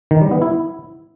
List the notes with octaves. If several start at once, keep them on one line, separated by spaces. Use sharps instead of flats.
D#3
G3
B3
E4